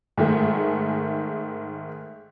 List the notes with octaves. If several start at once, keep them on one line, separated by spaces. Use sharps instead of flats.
G#2 D#3 A3 G#4